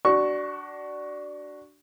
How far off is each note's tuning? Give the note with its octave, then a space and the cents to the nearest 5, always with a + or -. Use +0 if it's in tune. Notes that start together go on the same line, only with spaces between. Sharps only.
D4 +0 F#4 +30 C#6 +0